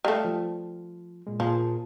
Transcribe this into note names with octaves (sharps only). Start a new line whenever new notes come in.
G3 A3 D#5 F5 A5
F3
A#2 G#3
A#2 F3 G#4 A5